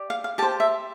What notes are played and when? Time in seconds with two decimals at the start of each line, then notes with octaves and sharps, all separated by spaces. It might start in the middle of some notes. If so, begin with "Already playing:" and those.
Already playing: G4 D5
0.10 F5
0.24 F5
0.38 G4 A5
0.42 C5
0.60 E5